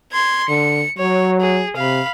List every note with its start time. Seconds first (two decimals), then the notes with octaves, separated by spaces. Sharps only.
0.12 C6 G#6
0.49 D3 C#7
0.98 F#3 C#5
1.40 G#4
1.77 C3 F5 B5